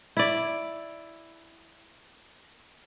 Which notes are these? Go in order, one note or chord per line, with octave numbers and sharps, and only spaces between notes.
E4 D5